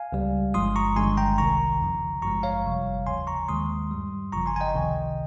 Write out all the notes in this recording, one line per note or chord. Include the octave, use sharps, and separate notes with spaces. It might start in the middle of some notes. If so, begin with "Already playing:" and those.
Already playing: F5 G#5
C#2 C#3 G3
G1 G2 F3 G#3 C6 D#6
A#5 C#6
G1 G2 D#3 G#3 G#5 C6
G5 A#5
C2 C3 D#3 A#5 C#6
F2 C#3 F3
G#1 G2 F3 G#3 A#5 C#6
C#5 F5
G1 F2 C3 G3
D#2 C#3 F3 G#5 C6
A#5 C#6
D#2 D#3 G#3 C6 D#6
G2 G3
G1 F2 C#3 F3 A#5 C#6
G#5 C6
G#5
D#5 G5
C#2 C3 D#3